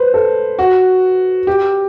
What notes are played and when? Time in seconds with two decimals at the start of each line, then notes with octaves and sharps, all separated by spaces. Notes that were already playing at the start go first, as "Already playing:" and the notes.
Already playing: B4 C5
0.14 A4
0.59 F#4
1.47 G4